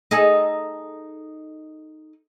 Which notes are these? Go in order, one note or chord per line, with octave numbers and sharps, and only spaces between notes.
D#4 G#4 A4